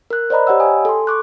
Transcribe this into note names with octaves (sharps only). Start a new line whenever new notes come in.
A#4 F#6
C5 D5 D#5 A#5 B5
G4 C#5 D#5 F#5 B5 E6
G5 G#5 D#6
A4 C6
C#6 D6 F#6